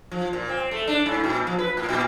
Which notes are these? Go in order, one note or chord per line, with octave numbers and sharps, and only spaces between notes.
F3
A#2
C4
A3
D4
G#2
A#2
F3
B4
A2
A#2